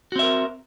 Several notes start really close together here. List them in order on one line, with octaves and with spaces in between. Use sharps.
F#4 C4 E5 A#4